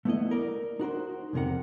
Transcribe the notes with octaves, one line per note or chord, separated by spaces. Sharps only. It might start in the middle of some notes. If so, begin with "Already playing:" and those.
A3 B3 E4 D#5
A#4 D5
D#4 F#4 A#4 C5
C2 F2 C3 A#4 F#5